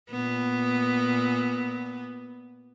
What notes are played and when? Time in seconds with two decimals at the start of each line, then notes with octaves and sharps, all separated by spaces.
0.11 A#2 B3